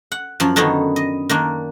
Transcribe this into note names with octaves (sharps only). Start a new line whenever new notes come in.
F#5
F#2 F3
D3 D#3 B3 C#4 D#4
D#5
D#3 A#3 D4